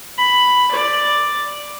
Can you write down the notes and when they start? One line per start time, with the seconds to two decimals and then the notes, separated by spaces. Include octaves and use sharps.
0.18 B5
0.71 D5